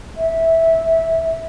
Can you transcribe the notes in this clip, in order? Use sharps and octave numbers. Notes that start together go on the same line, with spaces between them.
E5